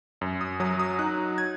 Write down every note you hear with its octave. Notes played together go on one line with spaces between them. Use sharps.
F#2
D#6
F#3 D#6
D#6
D#4 F#6
G#6